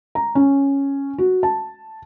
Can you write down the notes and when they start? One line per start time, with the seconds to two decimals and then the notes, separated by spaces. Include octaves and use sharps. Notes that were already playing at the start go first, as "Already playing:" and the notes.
0.15 A#5
0.35 C#4
1.18 F#4
1.43 A5